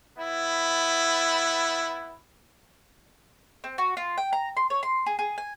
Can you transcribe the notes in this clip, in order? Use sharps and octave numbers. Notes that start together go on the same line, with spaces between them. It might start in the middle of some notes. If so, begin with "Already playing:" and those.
B3 E4
C4
F#4
F4
G5
A#5
C6
C#5
C6
G#4
G#4
G#5